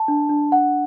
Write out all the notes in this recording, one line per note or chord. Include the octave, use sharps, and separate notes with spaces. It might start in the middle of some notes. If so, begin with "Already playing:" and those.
Already playing: A5
D4
D4
F#5